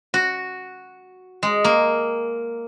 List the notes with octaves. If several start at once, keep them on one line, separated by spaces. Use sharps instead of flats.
F#4
G#3
A#3